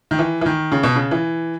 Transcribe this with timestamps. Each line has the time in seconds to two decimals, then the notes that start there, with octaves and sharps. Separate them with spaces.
0.11 D#3
0.19 E3
0.41 E3
0.46 D#3
0.72 C#3
0.83 B2
0.95 C#3
1.11 E3